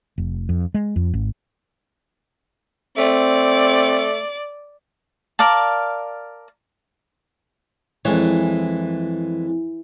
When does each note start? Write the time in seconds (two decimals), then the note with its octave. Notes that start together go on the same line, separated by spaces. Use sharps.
0.18 F1
0.49 F2
0.74 G#3
0.96 F2
1.14 G#1
2.98 A3 C4 D5
5.39 A#4 D5 F5 A5
8.05 F2 E3 G#3 C#5